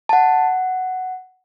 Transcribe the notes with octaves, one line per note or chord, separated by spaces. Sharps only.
A5
F#5